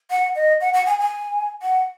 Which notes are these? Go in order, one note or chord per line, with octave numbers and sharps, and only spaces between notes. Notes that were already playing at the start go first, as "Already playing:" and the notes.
F#5
D#5
F#5
F#5
G#5
G#5
F#5